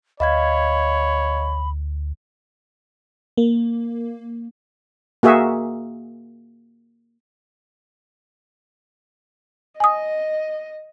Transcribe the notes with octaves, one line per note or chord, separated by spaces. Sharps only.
D2 C#5 D#5 F5 B5 G#6
A#3
A#3 F#4 G#4 E5
D#5 G#5 D#6